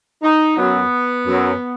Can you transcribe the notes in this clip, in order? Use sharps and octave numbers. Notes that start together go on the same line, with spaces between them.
D#4
F#2 F#3 B3
F#2
F#3